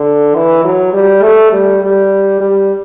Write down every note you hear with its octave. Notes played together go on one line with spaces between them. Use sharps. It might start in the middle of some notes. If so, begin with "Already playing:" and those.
Already playing: D3
E3
F#3
G3
A3
G3
G3
G3